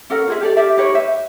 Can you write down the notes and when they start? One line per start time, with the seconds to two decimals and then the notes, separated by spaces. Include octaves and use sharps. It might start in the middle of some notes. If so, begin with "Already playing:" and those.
0.10 C#4 A4 A#4 F#5
0.28 F4 G#4 E5
0.41 G4 A4 D5
0.57 G4 A#4 D5 E5
0.77 D#4 G4 B4 C#5
0.95 B4 E5